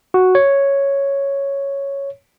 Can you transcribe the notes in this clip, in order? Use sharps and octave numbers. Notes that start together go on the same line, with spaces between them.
F#4
C#5